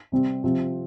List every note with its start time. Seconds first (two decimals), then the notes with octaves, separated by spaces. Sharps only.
0.12 C3 G3 C4
0.44 C3 F3 C4